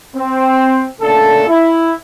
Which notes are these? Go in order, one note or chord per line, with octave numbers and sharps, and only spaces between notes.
C4
A#2 C#3 A3 D4 A4
E4